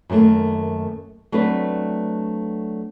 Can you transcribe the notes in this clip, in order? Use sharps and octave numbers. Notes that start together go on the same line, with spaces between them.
F#2 D#3 F#3 A3 A#3
F#3 A3 C4 D4 B4